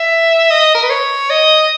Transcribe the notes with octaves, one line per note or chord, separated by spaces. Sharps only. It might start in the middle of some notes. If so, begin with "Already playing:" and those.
Already playing: E5
D#5
A#4
B4
C#5
D#5